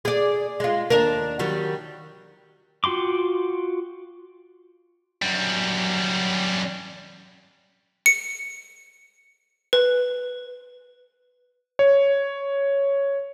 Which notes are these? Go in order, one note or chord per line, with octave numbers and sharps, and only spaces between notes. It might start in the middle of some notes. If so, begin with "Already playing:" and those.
G#4 D5
G#3 F4
D#2 D4 A#4
D#3 F#3 G3
F4 F#4 G5 C6 D6
F#2 G3
C#7
B4
C#5